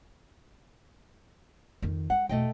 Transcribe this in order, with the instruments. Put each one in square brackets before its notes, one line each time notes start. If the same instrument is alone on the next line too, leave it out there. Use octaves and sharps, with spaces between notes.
[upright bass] F2 D#3
[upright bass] G#3 [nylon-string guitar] F#5
[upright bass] E2 B2 [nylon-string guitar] A3 D#5 G5